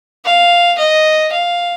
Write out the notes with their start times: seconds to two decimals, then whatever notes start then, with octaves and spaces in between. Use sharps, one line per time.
0.25 F5
0.78 D#5
1.32 F5